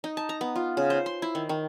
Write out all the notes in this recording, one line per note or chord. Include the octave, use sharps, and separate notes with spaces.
D#4
A5
A#5
B3
F4
C#3
C5
C6
E4
D#3
D#3